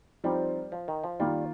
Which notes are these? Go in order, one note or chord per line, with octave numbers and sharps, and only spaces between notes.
F3 G3 C4 D#4
F3
D#3
F3
D#3 G3 A#3 F4